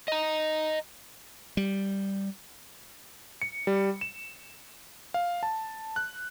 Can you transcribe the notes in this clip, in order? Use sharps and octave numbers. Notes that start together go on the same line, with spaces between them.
D#5 A#5
G3
C#7
G3
E7
F5
A5
F#6